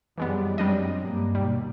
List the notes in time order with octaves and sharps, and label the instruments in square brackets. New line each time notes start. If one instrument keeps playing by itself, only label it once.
[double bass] F#2 G3 [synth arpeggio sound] E3 G#3 B3
[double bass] F#2 C4 [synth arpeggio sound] G3 D4 D#5
[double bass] G2 A#3
[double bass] D#2 B2 [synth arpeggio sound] G3